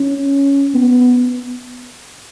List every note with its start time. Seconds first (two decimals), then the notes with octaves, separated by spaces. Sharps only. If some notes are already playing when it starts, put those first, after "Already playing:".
Already playing: C#4
0.74 B3